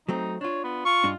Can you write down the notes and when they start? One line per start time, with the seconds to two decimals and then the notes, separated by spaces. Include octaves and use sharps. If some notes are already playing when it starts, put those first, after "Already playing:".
0.09 F#3 A3 C4 D#4
0.41 D4 F4 C#5
0.64 B3
0.85 F4 C#6
1.04 G2 D4 D#4